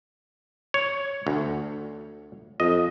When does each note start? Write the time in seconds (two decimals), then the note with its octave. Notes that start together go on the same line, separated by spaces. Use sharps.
0.74 C#5
1.27 D2
2.60 F2 D#5